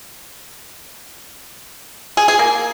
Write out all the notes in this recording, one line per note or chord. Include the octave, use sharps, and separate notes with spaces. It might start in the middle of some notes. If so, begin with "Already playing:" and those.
G#4
G#4
A#3